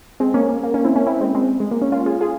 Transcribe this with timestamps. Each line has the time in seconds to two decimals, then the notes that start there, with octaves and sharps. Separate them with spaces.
0.20 G#3 C4
0.34 A#3 C#4
0.49 A#3
0.63 A#3
0.74 A#3 C#4
0.84 C4 E4
0.96 A#3 C#4
1.07 C4 E4
1.21 G#3 C4
1.35 G#3 C4
1.60 G#3
1.71 A#3
1.82 A#3 C#4
1.92 C#4 F4
2.06 F4 G#4
2.21 F4 G#4